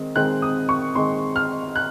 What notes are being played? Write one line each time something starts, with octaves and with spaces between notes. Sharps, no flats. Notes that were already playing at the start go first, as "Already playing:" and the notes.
Already playing: D#3 G#3 C4
D#3 G#3 C4 F#6
D#6
C#6
D#3 G#3 C4 C6
F6
F#6